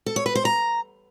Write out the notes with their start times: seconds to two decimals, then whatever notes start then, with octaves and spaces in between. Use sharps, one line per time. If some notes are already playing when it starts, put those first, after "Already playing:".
0.06 A4
0.16 C#5
0.26 B4
0.35 C5
0.45 A#5